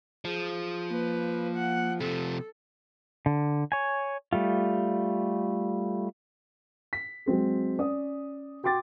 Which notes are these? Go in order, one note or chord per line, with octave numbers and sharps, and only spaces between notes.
F3 G#4
A#3 B4
F#5
C3 F3 A4
D3
C#5 G#5
G3 A3 F4
B6
F#3 G#3 C4 G#4
C#4 D5 D#6
F#4 G5 C6 D6 A6